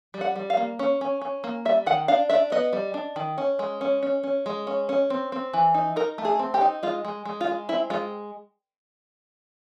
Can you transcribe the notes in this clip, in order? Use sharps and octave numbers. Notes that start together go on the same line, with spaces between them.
G3
F#5
G3
F5
A#3
C#4
C#4
C#4
A#3
G3 E5
D#3 F#5
D4 F5
D4 E5
B3 D#5
G3
D4
D#3
C#4
G#3
C#4
C#4
C#4
G#3
C#4
C#4
C4
C4
E3
D#4
D#4 A#4
A3
G#4
C4
G4
D#4
G#3 F4
G#3
G#3
F4
G#3
C4 E4
G#3 F4